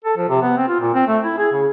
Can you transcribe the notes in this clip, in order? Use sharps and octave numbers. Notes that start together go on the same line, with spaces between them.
A4
F3
C3
B3
C4
F4
A#2
C4
A3
E4
G#4
C#3